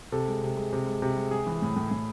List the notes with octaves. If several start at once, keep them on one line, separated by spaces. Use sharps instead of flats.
C3 A4
G#3
C3
G#3
C3
G#3
C3
G#3
G#3 G#4
E3
A2
A2
A2